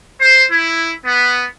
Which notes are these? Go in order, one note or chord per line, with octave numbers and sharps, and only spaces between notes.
C5
E4
B3